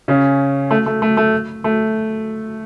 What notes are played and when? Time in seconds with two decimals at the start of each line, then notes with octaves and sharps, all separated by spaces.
0.08 C#3 C#4
0.71 A3
0.86 A3
1.02 A3
1.17 A3
1.64 A3